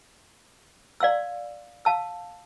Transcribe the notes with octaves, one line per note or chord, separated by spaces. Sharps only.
D5 F5 C6 E6
F5 A5 E6